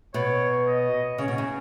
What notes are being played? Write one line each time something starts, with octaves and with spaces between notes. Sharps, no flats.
B2 C#5
D#5
C#3 C#5
B2
C#3